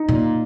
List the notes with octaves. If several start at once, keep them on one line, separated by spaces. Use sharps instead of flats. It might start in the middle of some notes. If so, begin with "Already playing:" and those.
Already playing: D#4
A#2